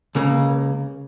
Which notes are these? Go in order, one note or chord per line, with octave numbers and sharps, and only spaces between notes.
C#2 C#3 A#3